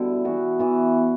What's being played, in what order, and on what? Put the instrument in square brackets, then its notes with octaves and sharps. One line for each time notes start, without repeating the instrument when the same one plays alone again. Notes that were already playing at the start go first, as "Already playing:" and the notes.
Already playing: [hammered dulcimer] B2 D3 G3 E4
E3 B3 F#4
E3 B3 F#4